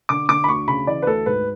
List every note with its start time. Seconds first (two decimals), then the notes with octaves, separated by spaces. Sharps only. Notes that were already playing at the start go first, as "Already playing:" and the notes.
0.09 D3 D6
0.29 D3 D6
0.44 B5
0.48 D2 C#6
0.67 C#3 B5
0.87 E3 D5
1.02 B4
1.06 D2 A4
1.26 G#2 B4